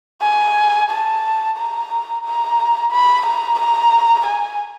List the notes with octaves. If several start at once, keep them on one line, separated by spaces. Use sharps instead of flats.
G#5
A5
A#5
A#5
B5
A#5
A#5
G#5